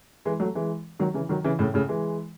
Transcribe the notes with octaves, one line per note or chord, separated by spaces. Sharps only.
E3 G#3
F#3 A3
E3 G#3
D#3 F#3
C#3 E3
D#3 F#3
C#3 E3
A2 C#3
A2 C#3
E3 G#3